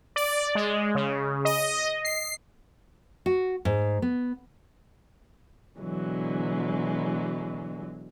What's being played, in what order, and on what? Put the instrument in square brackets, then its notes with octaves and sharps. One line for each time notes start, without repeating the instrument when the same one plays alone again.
[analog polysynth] D5
G#3
C#3
D#5
C7
[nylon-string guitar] F#4
G#2
B3
[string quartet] B2 D3 E3 F#3 G#3